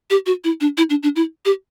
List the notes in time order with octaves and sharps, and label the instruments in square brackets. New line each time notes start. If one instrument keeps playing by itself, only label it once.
[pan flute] G4
F#4
E4
D4
E4
D4
D4
E4
G4